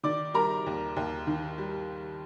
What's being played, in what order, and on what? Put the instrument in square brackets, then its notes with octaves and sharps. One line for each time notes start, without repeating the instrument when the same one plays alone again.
[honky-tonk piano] D#3 D5 D6
G3 A#4 A#5
D#2
D#2
D#3
G3